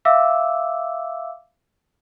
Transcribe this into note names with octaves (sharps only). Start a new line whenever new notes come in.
E5 F5 D6 E6